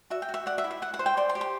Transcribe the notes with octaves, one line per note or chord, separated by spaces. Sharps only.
F#4 E5
G5
F#4
E5
D5 F#5
E5
E4
E5
E4 F#5
F#5
C5
G5
D5 C6
C6
G4
C6